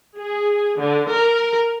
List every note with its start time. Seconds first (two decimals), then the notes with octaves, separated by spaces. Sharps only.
0.18 G#4
0.78 D3
1.09 A#4